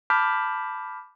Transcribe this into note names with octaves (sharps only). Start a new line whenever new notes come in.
A5 B5 D6 F6 G6 B6